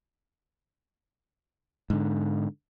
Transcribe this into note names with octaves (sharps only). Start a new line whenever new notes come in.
G#2 D3